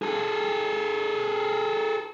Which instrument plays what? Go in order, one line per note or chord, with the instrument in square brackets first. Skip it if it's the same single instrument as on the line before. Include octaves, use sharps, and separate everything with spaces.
[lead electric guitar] G#4 A4